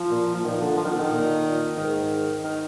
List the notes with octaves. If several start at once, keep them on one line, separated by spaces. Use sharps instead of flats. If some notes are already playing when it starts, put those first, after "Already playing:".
Already playing: F3
A#2
F3
A#2 D#3
D3
F3
D#3
D3
D#3
A#2
A#2
G#2 D#3
D#3